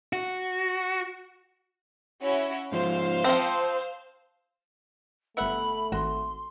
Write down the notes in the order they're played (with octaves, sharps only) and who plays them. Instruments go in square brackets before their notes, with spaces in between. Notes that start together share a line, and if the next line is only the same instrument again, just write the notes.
[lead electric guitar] F#4
[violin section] C#4 E4 F#4
[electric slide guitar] G#2 F3 [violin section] C5 F5
[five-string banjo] F3 C4 [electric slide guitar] A5
[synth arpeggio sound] G1 C#7 [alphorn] A3 [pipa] B3 E5 F#5 [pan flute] B5
[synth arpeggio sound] G#1 [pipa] F#4 [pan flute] C6